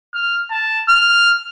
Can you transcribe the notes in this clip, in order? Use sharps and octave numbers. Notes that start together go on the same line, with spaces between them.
F6
A5
F6